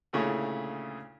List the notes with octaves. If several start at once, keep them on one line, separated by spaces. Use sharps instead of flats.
D2 A#2 C#3 A3 E4 C#5